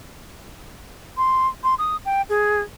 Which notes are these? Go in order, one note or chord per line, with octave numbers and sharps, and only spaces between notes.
C6
C6
D#6
G5
G#4